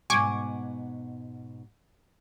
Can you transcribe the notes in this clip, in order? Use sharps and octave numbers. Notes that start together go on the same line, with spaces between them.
G#2 B2 F#5 G#5 C#6 D6